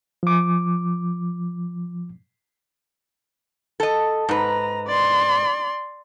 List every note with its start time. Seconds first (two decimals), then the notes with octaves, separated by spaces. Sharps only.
0.23 F3 D6
3.80 A4 D#5
4.29 G#2 B4 A#5
4.87 D5 C6